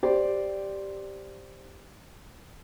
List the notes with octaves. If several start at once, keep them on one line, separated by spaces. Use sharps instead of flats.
G4 C5 D5